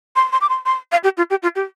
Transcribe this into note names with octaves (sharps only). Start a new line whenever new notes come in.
C6
C6
D6
C6
C6
F5
G4
F4
G4
F4
G4